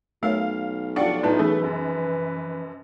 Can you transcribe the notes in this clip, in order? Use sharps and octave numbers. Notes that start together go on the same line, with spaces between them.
B1 A3 A#4 C#5 F5
F3 D4 F4 G4 A4 F#5 G5 C#6
A2 D4 D#4 F4 B4 A5
E3 A3 C#4 D#4 G#4 B4
F1 F#2